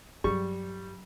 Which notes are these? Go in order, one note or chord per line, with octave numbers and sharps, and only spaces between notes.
G2 F#3 G3 C#6